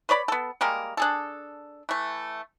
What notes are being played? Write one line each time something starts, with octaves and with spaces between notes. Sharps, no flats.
B4 C#5 D5 B5
B3 A4
G3 G#3 A#3 A#4
D4 G#4 A4
E3 A3